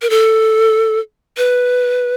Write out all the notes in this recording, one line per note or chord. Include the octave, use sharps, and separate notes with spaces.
A#4
A4
B4